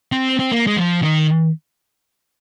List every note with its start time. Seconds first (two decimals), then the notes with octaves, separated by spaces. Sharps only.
0.12 C4
0.39 C4
0.52 A#3
0.67 G#3
0.76 F3
1.02 D#3